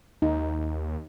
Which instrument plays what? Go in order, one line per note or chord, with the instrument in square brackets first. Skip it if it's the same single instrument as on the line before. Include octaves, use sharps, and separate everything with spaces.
[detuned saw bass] D#2 [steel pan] D#4